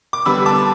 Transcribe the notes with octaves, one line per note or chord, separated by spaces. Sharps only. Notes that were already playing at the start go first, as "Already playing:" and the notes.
D6
D3 G3 B3 B5 E6
A5 D6